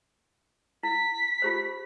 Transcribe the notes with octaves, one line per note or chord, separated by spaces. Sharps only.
E4 B6
F4 G4 C5